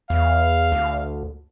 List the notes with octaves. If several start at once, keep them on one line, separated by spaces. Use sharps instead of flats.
E2 F5
D2